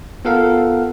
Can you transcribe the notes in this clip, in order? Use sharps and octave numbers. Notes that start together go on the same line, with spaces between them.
B3 F4 A4 A#4 F5 F#5